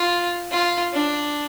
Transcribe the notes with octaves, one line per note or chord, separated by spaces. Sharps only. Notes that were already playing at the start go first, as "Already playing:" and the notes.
Already playing: F4
F4
D4